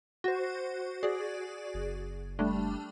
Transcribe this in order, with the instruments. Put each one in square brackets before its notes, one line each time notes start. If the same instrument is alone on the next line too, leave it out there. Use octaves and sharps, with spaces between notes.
[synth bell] F#4 C5
F#4 G#4 D5
[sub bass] F#1
[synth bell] G3 A3 D4